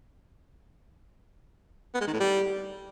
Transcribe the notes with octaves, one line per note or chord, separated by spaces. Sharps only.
B3
G#3
D#3
A2
G3